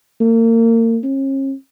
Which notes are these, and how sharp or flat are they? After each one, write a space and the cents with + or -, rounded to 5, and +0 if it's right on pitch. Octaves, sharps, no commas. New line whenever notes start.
A#3 -35
C#4 -40